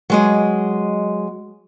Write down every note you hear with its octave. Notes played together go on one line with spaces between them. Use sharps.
F#3 G#3 D#5